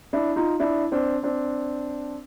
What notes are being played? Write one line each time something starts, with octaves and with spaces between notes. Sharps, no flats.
D4 E4
D#4 F4
D4 E4
C4 D4
C4 D4